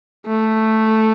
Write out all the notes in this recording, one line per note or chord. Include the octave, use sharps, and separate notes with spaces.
A3